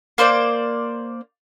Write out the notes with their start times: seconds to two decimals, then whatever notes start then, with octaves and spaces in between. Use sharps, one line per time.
0.18 A#3 C5 D5 G6